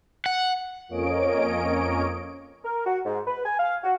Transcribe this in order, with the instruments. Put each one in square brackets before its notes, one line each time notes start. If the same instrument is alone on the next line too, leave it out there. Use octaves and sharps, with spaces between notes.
[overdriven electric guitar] F#5
[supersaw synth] F2 A#3 C#4 C#5 D#5 D7
[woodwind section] A#4
F#4
G#2
B4
G#5
F5
F#4